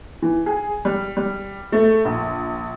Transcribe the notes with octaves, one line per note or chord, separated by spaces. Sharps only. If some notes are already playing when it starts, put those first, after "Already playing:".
E3
G#4
G3
G3
A3
A#1